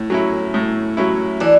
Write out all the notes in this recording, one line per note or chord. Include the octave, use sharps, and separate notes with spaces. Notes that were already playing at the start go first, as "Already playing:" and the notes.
Already playing: A2
F#3 C#4 E4
A2
F#3 C#4 E4
E3 D4